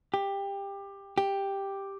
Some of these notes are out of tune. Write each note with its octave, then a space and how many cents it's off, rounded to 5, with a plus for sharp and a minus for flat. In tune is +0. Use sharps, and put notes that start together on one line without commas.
G4 +20
G4 +5